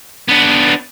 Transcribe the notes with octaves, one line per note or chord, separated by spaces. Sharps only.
B3 D4